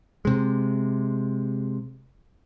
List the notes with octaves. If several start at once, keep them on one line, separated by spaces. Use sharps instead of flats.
C3 G#3